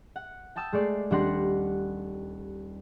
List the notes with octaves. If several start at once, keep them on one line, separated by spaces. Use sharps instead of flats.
F#5
G5 A5 D#6 E6
G#3 A3 D5 C7
D#1 G3 D4 F#5 C6 A#6